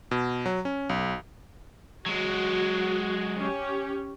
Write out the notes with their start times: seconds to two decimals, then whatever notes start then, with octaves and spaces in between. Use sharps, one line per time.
0.11 B2
0.46 F#3
0.65 C#4
0.89 B1
2.06 F#3 G#3 F#4
3.38 C#4 G4